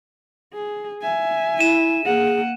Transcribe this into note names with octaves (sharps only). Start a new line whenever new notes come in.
G#4
E5 G#5
E4 D#7 E7
A#3 G#4 F#5